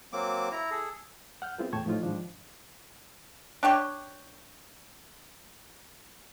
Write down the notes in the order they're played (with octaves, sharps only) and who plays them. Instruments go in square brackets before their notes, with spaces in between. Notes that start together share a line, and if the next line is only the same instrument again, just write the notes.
[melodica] F#3 A#3 C4 D6
E4 A#5
G#4 A4
[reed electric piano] F#5 F6 G6
B3 C4 E4 F4 G#4 A#4
E2 A2 G5 A5 C#6 G#6
A2 F3 D#4 F4
G#2 D#3 F3 G#3 D4
[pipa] D4 G4 C#5 G5